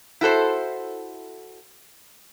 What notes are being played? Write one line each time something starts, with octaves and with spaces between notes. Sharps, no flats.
E4 F#4 A4 C5